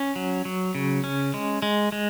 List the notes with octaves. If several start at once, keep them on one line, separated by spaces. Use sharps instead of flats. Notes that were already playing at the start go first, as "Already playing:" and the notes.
Already playing: C#4
F#3
F#3
C#3
C#4
G#3
G#3
G#3